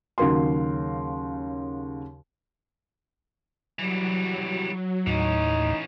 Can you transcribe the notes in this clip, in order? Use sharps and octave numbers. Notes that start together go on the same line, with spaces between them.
D#2 C#3 F#3 A#4 F5 C6
E3 F#3 G3
D#2 A2 E3 C#4 D#4